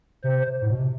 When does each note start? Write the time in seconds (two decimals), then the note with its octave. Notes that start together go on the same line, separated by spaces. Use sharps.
0.24 C3 C5
0.62 A2
0.70 B2
0.79 C3